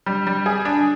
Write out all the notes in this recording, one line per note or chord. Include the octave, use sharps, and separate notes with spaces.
G3
G3
G#4
D4